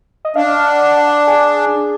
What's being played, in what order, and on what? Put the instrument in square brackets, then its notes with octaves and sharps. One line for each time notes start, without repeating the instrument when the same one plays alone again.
[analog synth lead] D#5
[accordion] D4 [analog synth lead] F5
[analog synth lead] F5
F#5
F#5
G#4